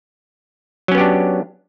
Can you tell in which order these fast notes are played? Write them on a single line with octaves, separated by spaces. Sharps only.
F#3 C#4 B3 G4 D4